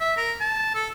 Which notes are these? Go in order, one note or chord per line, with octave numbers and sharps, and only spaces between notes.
E5
A#4
A5
A4